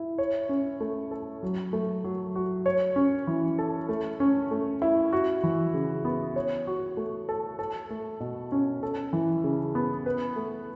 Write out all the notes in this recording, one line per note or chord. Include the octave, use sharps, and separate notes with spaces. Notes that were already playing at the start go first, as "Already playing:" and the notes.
Already playing: E4
C#5
C#4
A3
A4
F#3
A3
F#3
F#4
C#5
C#4
E3
A4
A3
C#4
A3
E4
F#4
E3
C#3
B3
C#5
F#4
A3
A4
A4
A3
B2
C#4
A4
E3
C#3
B3
B4
A3